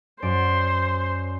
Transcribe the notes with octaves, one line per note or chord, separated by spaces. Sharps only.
F#2 C5 D5